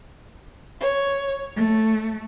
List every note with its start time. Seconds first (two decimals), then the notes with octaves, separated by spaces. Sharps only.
0.81 C#5
1.55 A3